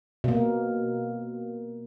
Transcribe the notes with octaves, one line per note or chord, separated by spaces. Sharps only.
B2 A#3